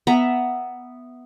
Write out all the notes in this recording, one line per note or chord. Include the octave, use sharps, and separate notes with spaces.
B3 E5 A#5